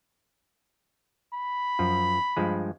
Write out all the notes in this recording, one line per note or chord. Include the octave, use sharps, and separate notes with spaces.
B5
F#2 F3
G2 F3 G#3